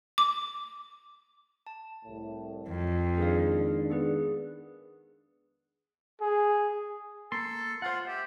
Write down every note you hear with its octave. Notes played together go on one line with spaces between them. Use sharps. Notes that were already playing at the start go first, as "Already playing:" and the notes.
D6
A5
C2 A2
F2
D#3 G#3 D4 G#4 B4 F5
B3 G#4 B4
G#4
A#3 A4 C6
F4 C5 F#5
G4 E5